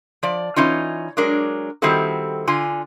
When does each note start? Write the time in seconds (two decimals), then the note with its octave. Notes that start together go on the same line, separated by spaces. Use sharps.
0.23 F3 D5
0.56 E3 C#4 D#4 F4
1.17 F#3 G#3 D4 A#4
1.82 D#3 G3 C4 E4 F#4 A4
2.47 D3 F4 G#5